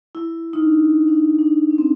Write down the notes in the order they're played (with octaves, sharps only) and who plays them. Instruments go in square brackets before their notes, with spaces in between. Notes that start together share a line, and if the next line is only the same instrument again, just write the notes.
[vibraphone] E4
D#4
D4
D4
D4
C#4
C4